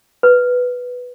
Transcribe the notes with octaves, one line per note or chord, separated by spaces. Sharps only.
B4